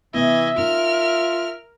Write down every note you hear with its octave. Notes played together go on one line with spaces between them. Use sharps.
C3 E3 B3 D#5 E5 G#6
C#4 D#4 F4 A#4 F6